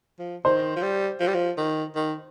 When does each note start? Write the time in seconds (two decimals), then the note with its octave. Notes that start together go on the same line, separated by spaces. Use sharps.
0.19 F3
0.45 D#3 C5
0.76 F3
0.82 G3
1.20 F3
1.28 G3
1.34 F3
1.57 D#3
1.95 D#3